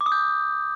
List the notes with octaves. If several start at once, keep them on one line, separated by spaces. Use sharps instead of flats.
D6
D#6
G6